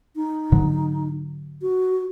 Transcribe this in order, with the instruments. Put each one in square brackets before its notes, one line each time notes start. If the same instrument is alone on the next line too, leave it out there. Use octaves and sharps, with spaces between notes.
[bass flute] D#4
[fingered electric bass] G#2 D3 F#3
[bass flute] F#4